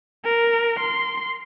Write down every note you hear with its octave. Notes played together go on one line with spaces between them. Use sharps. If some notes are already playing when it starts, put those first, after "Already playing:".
A#4
C6